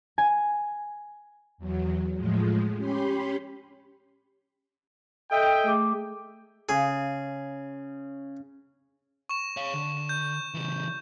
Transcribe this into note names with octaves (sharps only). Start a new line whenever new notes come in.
G#5
E2 F#3
A2 F3 G#3
C#4 G4 B5 C6
A4 D#5 E5 G5
A3 G#4 D6
C#3 G#4
C#6 E7
C#5 F5
D3
G6
C#3 E3